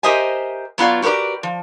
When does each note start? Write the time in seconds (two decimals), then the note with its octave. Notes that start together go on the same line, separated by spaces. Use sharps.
0.03 G4 A#4 C5 D#5 E5 G#5
0.78 F#3 B3 F4 C#5 D5
1.02 F#4 G4 A#4 B4 D5
1.43 F3